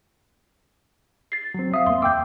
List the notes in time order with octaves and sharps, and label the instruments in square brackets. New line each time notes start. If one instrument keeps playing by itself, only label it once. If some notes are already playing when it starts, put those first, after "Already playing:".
[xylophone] A6 C7
[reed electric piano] F#3 C4
[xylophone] E5 F5 [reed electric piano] D#6
[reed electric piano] E2 A#3 [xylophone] C6
[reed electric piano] E2 G5 D6 [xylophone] E6 G6